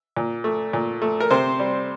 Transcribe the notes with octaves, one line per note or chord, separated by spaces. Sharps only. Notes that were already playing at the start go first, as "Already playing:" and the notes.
A#2
A3
A#2
A3
A#4
C3 C5
G3